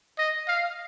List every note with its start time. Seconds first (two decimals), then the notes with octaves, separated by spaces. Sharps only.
0.18 D#5
0.48 F5